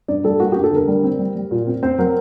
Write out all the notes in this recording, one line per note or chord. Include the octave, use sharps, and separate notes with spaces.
G2 D5
G3 A4
A#3 F#4
G2 G4
A4
D3 A#4
G3
C4
G3
G3
A#2
C4
C4 C5
F#3 A#4